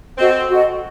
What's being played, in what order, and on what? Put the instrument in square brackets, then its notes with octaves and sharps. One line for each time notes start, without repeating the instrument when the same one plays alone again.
[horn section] C4 [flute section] F#4 A4 D#5
[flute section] F#4 A4 D#5